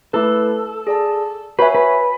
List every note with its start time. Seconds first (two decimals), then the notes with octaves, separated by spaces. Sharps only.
0.13 A3 E4 A4 B4
0.87 G#4 D5 A5
1.59 F#4 B4 C#5 E5 G#5
1.75 B4